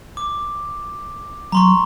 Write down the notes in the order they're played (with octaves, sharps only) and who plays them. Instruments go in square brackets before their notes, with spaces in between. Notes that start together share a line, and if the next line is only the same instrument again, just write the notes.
[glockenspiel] D6
[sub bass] F#3 [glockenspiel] A#5 C6 C#6